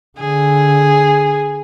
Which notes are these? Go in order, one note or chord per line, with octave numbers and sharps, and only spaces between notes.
D3 G#4